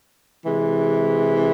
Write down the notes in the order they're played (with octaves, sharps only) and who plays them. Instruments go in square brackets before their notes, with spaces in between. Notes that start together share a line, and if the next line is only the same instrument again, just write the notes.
[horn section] C3 E3 G#3